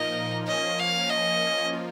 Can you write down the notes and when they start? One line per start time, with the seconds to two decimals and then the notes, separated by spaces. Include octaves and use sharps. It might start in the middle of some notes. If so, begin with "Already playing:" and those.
Already playing: A#2 F3 A#3 D#4 A#4 D#5
0.47 F3 A#3 C#4 D#5
0.79 F5
1.10 D#5
1.73 F3 A#3 F4